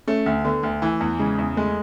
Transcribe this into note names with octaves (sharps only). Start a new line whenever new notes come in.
A3 C#4
D2
D3 B3
D2
E3 A3
E2
C#3 G#3
E2
G#3 A3